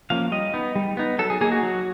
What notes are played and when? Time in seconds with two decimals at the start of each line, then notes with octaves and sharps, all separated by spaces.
0.10 F3 A#3 C#4 F5
0.32 G3 D#5
0.54 B3 D#4
0.75 G3
0.97 B3 D#4
1.19 F#3 A4
1.30 G#4
1.41 A#3 D#4 G#4
1.52 F#4
1.63 F#3